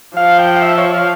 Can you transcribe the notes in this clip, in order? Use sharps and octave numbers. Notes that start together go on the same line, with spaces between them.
F3 F5
G5
F5
E5
C#5
F5